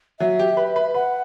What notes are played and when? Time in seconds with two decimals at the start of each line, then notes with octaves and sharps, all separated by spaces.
0.20 F#3 E5
0.39 G4
0.57 B4
0.76 B4
0.94 B4 F#5